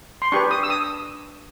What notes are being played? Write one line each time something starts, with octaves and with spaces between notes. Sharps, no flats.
C6
D4 G4 B4 C#6
D#6
E6
D#6